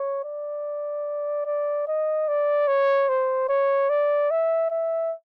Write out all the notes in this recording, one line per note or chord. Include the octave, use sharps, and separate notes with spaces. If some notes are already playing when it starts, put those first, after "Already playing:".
Already playing: C#5
D5
D5
D#5
D5
C#5
C5
C#5
D5
E5
E5